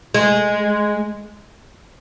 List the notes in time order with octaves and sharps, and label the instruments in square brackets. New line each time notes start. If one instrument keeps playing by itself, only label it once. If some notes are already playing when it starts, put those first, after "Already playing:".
[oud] G#3